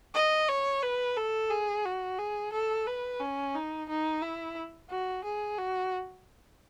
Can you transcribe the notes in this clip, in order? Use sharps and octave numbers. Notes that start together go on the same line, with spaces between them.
D#5
C#5
B4
A4
G#4
F#4
G#4
A4
B4
C#4
D#4
D#4
E4
F#4
G#4
F#4